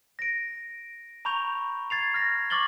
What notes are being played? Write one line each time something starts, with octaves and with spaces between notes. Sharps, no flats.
A#6 D7
A#5 B5 C#6 G6 F7
G#6 A6 C7 F7
F6 A#6
C#6 D6 F6 A6 F#7 G7